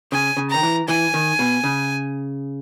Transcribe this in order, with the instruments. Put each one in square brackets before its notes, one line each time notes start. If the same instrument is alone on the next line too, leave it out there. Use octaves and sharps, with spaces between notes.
[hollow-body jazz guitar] C#3 [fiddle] G#5
[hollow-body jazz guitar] C#3
[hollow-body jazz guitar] D#3 [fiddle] A#5
[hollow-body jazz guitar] E3
[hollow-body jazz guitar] E3 [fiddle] G#5
[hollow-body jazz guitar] D#3
B2
C#3